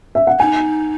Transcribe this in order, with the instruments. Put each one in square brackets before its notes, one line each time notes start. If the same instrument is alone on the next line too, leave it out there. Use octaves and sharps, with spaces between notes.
[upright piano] E5
F#5
[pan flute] D#4 [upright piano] G#5